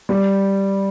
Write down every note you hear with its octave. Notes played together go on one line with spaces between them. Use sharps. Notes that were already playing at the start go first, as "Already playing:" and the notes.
G3